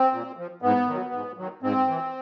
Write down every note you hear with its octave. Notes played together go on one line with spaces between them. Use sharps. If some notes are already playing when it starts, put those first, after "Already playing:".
Already playing: C4
A#2
F3
G#2 B3
D#3 F#3
G#2
D#3 F#3
G#2 C4
E3